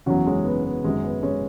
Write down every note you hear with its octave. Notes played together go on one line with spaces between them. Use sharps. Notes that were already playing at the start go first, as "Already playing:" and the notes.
F#1 E2 C#3 F#3 C#4 F#4
G#3 C#4
B3
B3
G#1 F#2 F#3 G#3
B3
G#3 C#4